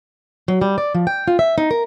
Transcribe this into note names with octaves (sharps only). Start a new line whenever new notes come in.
F#3
G3
D5
F3
G5
F4
E5
D#4
A#4